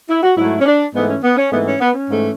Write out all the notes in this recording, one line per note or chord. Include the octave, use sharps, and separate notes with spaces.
E4
F#4
G#2 F#3 A3 E4
C#4
D4
G#2 E3 A3 B3
C#4
B3
C#4
G#2 E3 A3 B3
B3
C#4
B3
C#4
G#2 E3 A3